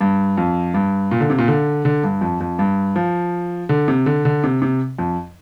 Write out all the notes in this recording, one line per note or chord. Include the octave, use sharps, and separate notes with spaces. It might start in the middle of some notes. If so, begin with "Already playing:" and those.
G2
F2
G2
A#2
D3
C3
A#2
D3
D3
G2
F2
F2
G2
F3
D3
C3
D3
D3
C3
C3
F2